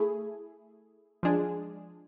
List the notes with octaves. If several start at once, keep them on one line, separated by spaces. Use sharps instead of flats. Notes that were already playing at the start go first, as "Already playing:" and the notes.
Already playing: A3 E4 G#4
F3 G#3 D4 G#4